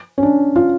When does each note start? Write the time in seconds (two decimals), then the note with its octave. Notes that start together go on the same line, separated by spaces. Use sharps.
0.18 C#4
0.23 D4
0.56 F4